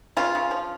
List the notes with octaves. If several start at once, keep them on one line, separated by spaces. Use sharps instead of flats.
C#3 F4
C#3
F3